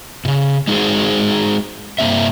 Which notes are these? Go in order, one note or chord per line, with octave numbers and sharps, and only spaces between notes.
A#2 C#3
G#3 D#4 F#4 G#4 C5
G2 C3 A#3 C4 E5